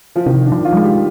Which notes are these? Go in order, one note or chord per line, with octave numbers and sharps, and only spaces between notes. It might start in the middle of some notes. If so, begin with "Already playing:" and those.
F3
C3 D#3
D4
F3
F4
G3
G#3
G4